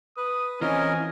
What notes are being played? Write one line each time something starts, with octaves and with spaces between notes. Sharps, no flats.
B4 D#6
E3 C4 C#4 F4 A#4 D#5 G#5